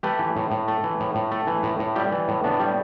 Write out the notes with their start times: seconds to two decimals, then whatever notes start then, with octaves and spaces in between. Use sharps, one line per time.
0.03 A3 G4 B4
0.19 E3
0.36 A2
0.51 A2
0.68 A3
0.84 E3
1.00 A2
1.15 A2
1.31 A3
1.47 E3
1.63 A2
1.79 A2
1.95 G3 E4 G4
2.11 E3
2.28 A2
2.44 A2 B3 D4
2.60 G3